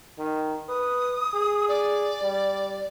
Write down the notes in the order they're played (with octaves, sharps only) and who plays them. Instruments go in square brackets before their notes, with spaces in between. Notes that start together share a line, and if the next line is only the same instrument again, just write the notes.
[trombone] D#3
[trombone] B4 [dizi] D#6
[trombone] G#4
[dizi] D5
[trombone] G3